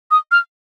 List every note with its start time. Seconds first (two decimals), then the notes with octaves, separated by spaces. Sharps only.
0.11 D#6
0.32 F6